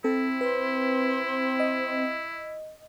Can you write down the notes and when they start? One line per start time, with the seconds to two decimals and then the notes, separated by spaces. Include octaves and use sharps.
0.04 C4 E4 A4
0.41 B4 C5
1.60 D#5